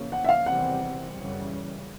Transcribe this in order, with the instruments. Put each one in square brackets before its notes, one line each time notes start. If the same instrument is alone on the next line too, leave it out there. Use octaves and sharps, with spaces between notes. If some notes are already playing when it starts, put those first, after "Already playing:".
Already playing: [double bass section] E2 C#3 F3 A#3 C#4
[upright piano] F#5
E5
F5
[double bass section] E2 C3 D#3 G3 C4 [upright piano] F#5
[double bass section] F#2 C#3 E3 G3